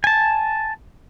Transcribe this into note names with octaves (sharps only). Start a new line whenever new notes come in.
G#5 A5